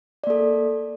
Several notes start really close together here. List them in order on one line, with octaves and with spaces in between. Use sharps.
D5 A#3 A4